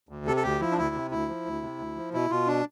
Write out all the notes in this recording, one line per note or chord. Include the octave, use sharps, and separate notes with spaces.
D2
C3 A4
A4
D2 G4
F3 E4
D4
D2 E4
C3
D2 E4
F3
D2
C3
D2
F3
B2 E4
B2 F4
D4